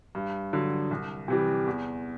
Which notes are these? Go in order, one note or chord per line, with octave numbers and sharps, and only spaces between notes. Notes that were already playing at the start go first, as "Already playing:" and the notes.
G2
D3 F#3
C2
C3 E3 G3
E2